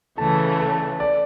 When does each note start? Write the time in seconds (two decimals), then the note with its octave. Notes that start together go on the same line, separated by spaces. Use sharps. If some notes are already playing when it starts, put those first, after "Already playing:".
0.18 C#3 E3 A3 A5
0.60 A5
1.00 D5